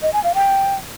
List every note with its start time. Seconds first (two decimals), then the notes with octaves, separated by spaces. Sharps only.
0.02 D#5
0.13 G#5
0.24 F5
0.34 G5